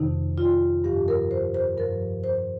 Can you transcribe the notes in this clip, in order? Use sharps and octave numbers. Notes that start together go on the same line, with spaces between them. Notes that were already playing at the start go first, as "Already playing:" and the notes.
Already playing: F2 C3 D#3 D#4
F4
G2 F3 G4
A#4
C5
C5
G2 F3 A#4
C5